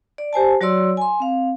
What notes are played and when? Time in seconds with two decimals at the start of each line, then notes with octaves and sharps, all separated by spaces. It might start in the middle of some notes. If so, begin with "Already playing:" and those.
0.18 D5
0.33 G4 C5 G#5 A5
0.61 F#3 F#4 C#5 D5 C6 E6
0.97 G#5 C6
1.20 C4 F5